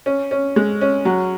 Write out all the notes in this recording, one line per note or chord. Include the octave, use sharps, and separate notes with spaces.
C#4
C#4
G#3
C#4
F#3